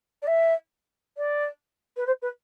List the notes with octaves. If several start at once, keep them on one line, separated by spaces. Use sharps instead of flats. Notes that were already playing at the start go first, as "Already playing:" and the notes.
D5
E5
D5
B4
C5
B4